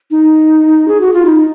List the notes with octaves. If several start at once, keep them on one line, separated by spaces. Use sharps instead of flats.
D#4
G#4
F#4
F4
D#4